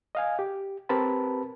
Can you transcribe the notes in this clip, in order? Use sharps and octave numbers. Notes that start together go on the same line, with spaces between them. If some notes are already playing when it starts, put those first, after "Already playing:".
D#5 F5 G#5
G4
C4 G4 A#4 B4 A5 B5